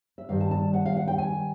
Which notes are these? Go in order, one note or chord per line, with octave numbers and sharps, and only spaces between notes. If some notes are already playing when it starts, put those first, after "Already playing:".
E5
G2 D#3 G3 F5
A5
A5
F#5
F5
F#5
G5
G#5